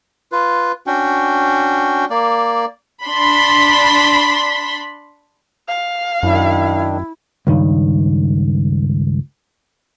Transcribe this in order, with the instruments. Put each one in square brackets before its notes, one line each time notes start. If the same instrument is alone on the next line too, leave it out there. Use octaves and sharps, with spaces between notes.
[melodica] F4 B4
C#4 D4 F#4 G5
A#3 D5
[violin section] D4 B5 C6 B6
[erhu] F5
[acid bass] F#2 [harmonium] D#3 D4 [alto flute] E4
[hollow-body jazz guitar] C#2 G2 D#3